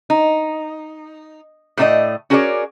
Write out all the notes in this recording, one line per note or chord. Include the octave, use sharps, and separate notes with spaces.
D#4
A2 A3 C#4 D#4 D5 D#5
C#4 F#4 G#4 A#4 C#5 D5